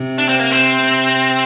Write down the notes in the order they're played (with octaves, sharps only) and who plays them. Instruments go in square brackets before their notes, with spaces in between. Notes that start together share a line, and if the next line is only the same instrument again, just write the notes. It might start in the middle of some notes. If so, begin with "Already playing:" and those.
Already playing: [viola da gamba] C3
[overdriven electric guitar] D4
C4
A#3
C4